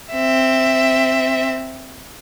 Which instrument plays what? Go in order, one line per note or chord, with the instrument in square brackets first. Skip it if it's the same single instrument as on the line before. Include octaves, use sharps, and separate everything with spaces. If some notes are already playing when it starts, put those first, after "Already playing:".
[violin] C4 E5